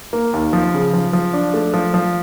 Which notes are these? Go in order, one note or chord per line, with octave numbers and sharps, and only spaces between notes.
A#3
D#2
F3
C#3
F3
F3
D4
A3
F3
F3